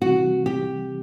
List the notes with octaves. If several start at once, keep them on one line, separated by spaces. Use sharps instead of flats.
C3 E3 G3 C4 F#4
G4